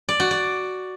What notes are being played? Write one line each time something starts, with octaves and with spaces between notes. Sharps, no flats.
D5
F#4
D5